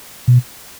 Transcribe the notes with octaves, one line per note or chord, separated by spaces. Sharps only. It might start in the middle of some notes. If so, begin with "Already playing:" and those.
B2